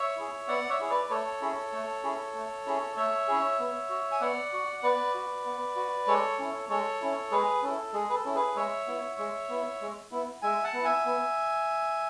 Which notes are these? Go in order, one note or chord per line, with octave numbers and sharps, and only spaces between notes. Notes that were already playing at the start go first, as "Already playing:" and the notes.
Already playing: C#5 E5
E4 G#4
B3 D5 F#5
C#5 E5
E4 G#4
B4 D5
A3 A4 C#5
C#4 E4 G#4
A3
C#4 E4 G#4
A3
C#4 E4 G#4
A3 C#5 E5
C#4 E4 G#4
B3
F#4
G#5
B3 D5 F#5
F#4
B3 B4 D5
F#4
B3
F#4
G#3 A4 C#5
C#4 E4
G#3 A4 C#5
C#4 E4
G#3 G#4 B4
C#4 E4 A4
G#3 G#4
B4
A4
C#4 E4
G#4 B4
G#3 C#5 E5
B3 E4
G#3
B3 E4
G#3
B3 E4
G#3 E5 G#5
F#5 A5
B3 E4
E5 G#5
B3